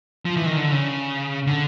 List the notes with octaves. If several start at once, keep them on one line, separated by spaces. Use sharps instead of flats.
F3
E3
D#3
D3
C#3
D3